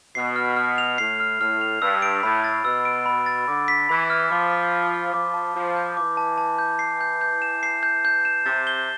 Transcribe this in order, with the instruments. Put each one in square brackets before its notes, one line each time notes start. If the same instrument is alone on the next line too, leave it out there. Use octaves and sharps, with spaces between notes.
[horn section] B2 [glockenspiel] C7
[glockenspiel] F6
F6
F7
[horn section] A2 [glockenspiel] C7
[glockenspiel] F6
[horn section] A2 [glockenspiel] F6
[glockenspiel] F7
[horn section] G2 [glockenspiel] E6
[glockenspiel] D7
[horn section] A2 [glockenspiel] B5
[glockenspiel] A6
[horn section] B2 [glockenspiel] E6
[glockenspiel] D7
B5
A6
[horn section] D3 [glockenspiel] D6
[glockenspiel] B6
[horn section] E3 [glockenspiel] B5
[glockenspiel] F6
[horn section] F3 [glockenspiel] D6
[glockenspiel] B6
B5
F6
[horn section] F3 [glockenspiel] D6
[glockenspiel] A5
[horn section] F3 [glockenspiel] A5
[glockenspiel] G6
[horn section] E3 [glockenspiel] D6
[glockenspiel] A5
A5
G6
C7
G6
G6
E7
C7
G6
G6
E7
[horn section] C3 [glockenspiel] A6
[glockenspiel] G7